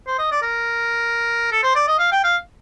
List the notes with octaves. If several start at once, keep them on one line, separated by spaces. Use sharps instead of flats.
C5
D#5
D5
A#4
A4
C5
D5
D#5
F5
G5
F5